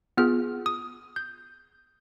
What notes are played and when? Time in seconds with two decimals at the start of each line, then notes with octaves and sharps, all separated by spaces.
0.17 B3 F4 G#4 F6
0.66 D#6
1.16 G6